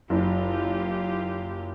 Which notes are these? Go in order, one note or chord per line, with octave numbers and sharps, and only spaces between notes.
F#1 F4 G4